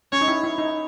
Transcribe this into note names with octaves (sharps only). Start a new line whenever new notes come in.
C#4 C#5
D#4
E4
E4
D#4